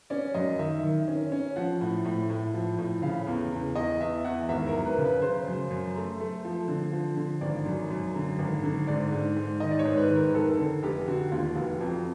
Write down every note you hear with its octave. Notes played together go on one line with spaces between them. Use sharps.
C#4 D5
F#2 D#5
D#3 E5
D#3
C#4
C#4
F3 F#5
A2
A2
A2
F3
A2
C#3 F5
E2
E2
E2 D#5
E2 E5
E2 F#5
G#1 E5
A#4
F#2
B4
C#3
B4
C#3 C5
F#2
F#2
A3
A3
F3
D3
F3
D3
G#1 D5
F#2
F#2
D3
G#1
D3
G#2 D5
G#2
G#2
D#3 D#5
D5
C#5
G#2
B4
D#3
A#4
F1 A4
D3
F1 G4
D3 F#4
D#2 F4
F1 F#4
F2